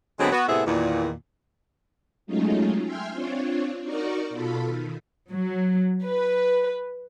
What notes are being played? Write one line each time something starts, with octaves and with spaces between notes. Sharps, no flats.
D3 F#3 G#3 B3 C4 G#4
B3 F#4
A2 C3 B3 G#4 E5
E2 A#2 D#3
F#3 G#3 A3 C#4 D#4 F4
E5 G5 G#5 C6 F6
C4 D4 F4 C#5
D#4 F#4 A#4 D5 C#6
B2 F4 A4 B5
D#3
F#3
B4